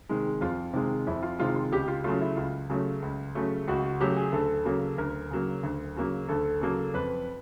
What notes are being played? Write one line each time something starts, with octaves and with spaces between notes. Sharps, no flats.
C3 D#3 G#3
F2 F4
C3 D#3 G#3
F2 E4
F4
C3 D#3 G#3 F4
F4
C#2 G4
F4
C#3 F#3 A3 F4
E4
C#2 F4
C#3 F#3 A3
C#2
C#3 F#3 A3
C#2 F#4
F#4
C#3 F#3 A3 G4
G#4
D2 A4
C#3 F#3 A#3
D2 A#4
C#3 F#3 A#3
D2
C#3 F#3 A#3
D2 A4
C#3 F#3 A#3 A4
F2 B4